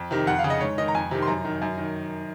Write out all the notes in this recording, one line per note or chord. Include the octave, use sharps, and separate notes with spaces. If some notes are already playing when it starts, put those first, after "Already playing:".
Already playing: F2
C3 D#3
F2 F#5
F5
C#3
D#5
G#2 C#5
D#3 D#5
A#5
F2 G#5
C3 D#3
C6
F#2 A#5
D#3
F#2
D#3